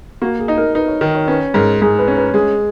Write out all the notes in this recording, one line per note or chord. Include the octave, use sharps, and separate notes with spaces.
A#3 F#4
G#4
D#4
A#4
D#4 B4
C#5
D#3
C#5
C#4 B4
G#2 A#4
G#2 G#4
B4
C#4
B4
G#3 G#4